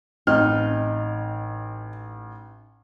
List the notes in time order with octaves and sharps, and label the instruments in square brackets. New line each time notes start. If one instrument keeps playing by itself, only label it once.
[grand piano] A1 F6 [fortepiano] C4 [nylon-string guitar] D#4